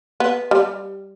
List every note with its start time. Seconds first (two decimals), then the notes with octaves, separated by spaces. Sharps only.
0.20 B3
0.51 G3